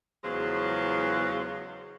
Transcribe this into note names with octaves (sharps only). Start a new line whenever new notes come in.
E2 C#3 F3 F#3 G#3